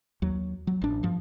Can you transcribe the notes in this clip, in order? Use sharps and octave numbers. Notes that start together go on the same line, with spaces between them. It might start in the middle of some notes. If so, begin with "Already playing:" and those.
D#2 F#3
F#3
A1 D4
G2 F3